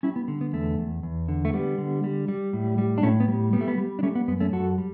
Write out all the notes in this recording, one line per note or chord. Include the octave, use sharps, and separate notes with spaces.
G3 C#4 E4
B3
D3
B3
E2 A3
E2
E2
D3
A3
G3 B3
D3
G3
G3
A2
G3
D4
A2 A3 C#4
B3
G3
G3 B3
A3
B3
G3
D4
G3 A3 C#4
B3
F#2 B3
A3 C#4
F#2 F#4 A4
G3